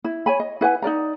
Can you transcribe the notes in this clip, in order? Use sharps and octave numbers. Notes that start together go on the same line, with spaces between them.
E4
C#5 G#5 B5
D#5
E4 B4 F#5 G#5
D#4 A#4 D5 A#5